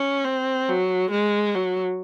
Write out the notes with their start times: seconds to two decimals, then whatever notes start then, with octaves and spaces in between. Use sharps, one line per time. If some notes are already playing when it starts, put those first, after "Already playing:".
Already playing: C#4
0.25 C4
0.69 F#3
1.11 G#3
1.55 F#3